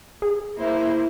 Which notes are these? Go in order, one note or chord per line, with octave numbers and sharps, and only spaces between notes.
G#4
A#3 E4 C5